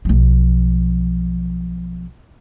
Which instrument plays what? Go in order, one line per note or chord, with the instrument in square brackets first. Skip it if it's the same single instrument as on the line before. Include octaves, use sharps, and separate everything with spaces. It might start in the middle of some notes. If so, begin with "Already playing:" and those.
[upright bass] B1 F3